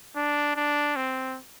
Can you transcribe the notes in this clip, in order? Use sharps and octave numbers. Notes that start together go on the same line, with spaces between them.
D4
D4
C4